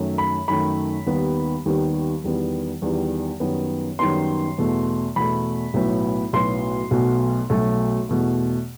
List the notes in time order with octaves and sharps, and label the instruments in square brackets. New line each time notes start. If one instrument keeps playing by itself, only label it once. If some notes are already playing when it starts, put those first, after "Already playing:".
Already playing: [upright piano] F#2 D#3 A3
B5
F#2 D#3 A3 B5
D#2 D#3 G3 B3
D#2 D#3 G3 B3
E2 D#3 G3 B3
E2 D#3 G3 B3
F#2 D#3 G3 B3
F#2 D#3 G3 B3 C6
E2 B2 A3
E2 B2 A3 B5
B1 A2 F#3 B3
B1 A2 F#3 B3 C6
B1 B2 F#3 A3
B1 B2 F#3 A3
E2 B2 A3